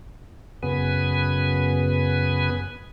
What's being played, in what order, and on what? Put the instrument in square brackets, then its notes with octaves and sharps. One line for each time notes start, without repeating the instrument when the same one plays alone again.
[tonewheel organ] F#2 C#3 B3 B4 G#5